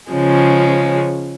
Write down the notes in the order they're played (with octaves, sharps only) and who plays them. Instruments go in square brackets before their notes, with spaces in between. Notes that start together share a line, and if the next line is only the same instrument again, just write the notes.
[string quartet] C#3 F3 G#3 C#4